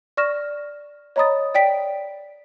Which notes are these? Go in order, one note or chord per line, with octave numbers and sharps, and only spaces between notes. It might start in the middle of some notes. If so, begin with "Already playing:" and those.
D5 C#6 F6 A#6 E7
C#5 D#5 A#5 B5 D#6 A6
D5 G5 B6 D7